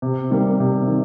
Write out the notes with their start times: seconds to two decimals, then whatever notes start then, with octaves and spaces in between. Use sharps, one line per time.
0.02 C3
0.30 D#3 G3 A#3
0.60 C3
0.87 D#3